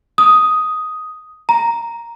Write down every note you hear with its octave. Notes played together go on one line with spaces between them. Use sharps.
D#6
A#5